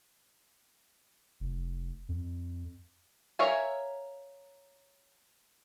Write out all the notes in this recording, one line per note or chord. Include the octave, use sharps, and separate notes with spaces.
F1
F2
A#4 C#5 E5 F5 G#5